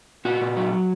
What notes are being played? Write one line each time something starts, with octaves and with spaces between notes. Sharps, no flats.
A#2 F#4
A#2
F#3